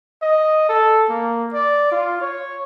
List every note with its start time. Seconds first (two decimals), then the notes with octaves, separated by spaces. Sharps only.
0.22 D#5
0.69 A4
1.09 A#3
1.54 D5
1.92 F4
2.22 C#5